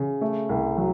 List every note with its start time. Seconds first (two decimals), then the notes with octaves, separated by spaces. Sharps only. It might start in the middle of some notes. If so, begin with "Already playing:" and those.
Already playing: C#3
0.21 A3
0.49 C2
0.78 F#3